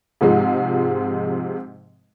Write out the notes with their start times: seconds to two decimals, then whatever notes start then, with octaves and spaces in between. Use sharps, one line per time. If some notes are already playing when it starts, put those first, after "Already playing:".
0.21 G#2 C3 F3 G#3